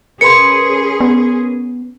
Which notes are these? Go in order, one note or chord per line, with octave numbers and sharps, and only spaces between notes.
C#4 G#4 A#4 B4 C6 C#7
B3